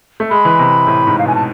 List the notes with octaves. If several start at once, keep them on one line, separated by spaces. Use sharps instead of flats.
A3
G#3 B5
E3
C3
A2
G#2
F5
B2 G#5
A5